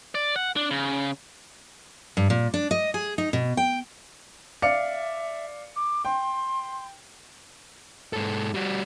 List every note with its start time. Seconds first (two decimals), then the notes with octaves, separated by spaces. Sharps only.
0.15 D5
0.36 F#5
0.56 D4
0.71 C#3
2.17 G2
2.30 A#2
2.54 D4
2.71 D#5
2.94 G#4
3.18 D#4
3.33 B2
3.57 G5
4.62 D5 E5 F5 C#7
5.76 D6
6.05 G5 C6
8.13 G#2 A4
8.54 G3 F#4